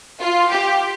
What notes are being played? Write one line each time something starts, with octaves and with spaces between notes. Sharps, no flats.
F4
G4